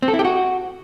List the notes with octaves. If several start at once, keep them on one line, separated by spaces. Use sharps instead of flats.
C4
A4
E4
G4
F#4